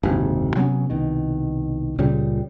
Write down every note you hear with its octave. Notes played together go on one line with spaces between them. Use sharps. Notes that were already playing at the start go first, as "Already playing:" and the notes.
F#1 D#2 G#2 C3
C3 F#3 B3 C#4
C2 B2 D#3
C#2 A#2 C#3 G3